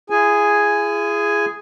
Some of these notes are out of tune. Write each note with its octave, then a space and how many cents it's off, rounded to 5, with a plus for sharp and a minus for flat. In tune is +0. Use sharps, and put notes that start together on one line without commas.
E4 +45 G#4 +0 G#5 +0